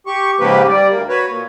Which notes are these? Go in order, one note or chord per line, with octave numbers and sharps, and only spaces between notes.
G4 C#6
G#2 C#3 F3 A#3 G4 B4
G3 D5
D2 A#3
F#4 B4 C#5
A#2